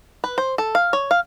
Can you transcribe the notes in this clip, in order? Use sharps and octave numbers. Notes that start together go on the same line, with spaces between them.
B4
C5
A4
F5
C#5
F5